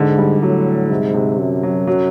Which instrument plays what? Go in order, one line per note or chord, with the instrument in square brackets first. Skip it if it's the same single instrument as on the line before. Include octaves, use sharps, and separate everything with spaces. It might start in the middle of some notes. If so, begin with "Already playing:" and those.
Already playing: [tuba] G#2 [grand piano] D3
[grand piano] G3
[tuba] A2 [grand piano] F#3
[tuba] G#2 [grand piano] C3
[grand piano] C3
[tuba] F#2
[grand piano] F#3
F#3